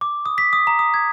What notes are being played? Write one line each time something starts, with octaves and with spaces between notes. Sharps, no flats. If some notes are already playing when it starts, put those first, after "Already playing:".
D6
D#6
B6
D#6
A#5
D#6
G#6